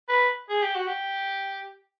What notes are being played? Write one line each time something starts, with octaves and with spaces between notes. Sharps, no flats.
B4
G#4
G4
F#4
G4